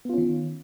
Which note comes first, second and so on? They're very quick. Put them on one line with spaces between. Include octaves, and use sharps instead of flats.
B3 F4 C#4 D#3